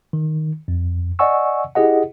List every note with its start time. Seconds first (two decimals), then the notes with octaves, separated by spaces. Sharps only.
0.13 D#3
0.68 F2
1.19 D5 D#5 F#5 G#5 C#6 E6
1.75 E4 G4 G#4 D#5 F#5